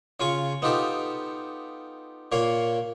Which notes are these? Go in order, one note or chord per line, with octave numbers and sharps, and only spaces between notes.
C#3 F4 G#5 C#6
B3 D#4 F4 G4 A4
A#2 A#3 C#5 F5